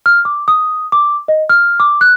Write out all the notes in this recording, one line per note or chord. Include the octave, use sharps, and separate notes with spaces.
F6
D6
D#6
D6
D#5
F6
D6
F#6